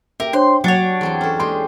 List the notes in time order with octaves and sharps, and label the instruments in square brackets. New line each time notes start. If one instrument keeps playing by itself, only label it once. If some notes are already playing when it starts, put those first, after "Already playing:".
[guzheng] G4 [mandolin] A#4 [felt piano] E5
[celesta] D4 C5 C#5 [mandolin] C6
[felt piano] F#3 [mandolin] D4 C#5 [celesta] F#5 A6 C#7
[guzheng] E2 C4 G5
C#4 A4
[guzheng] G#3 G4 G5 [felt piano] C6